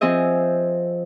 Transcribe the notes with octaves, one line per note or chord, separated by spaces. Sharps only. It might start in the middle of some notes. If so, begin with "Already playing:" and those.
F3 C4 G#4 D#5 E5